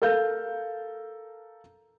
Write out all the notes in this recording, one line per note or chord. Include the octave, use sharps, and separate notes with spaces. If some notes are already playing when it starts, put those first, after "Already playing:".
A4 A#4 F5 G6